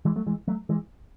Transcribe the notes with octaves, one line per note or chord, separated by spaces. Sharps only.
E3 G#3
F#3 A3
E3 G#3
F#3 A3
E3 G#3